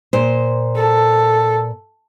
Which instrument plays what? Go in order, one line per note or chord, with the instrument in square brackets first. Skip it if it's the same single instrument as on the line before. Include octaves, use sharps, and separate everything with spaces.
[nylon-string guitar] A#2 C5
[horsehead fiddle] A4